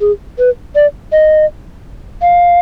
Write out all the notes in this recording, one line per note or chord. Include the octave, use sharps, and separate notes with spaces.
G#4
B4
D5
D#5
F5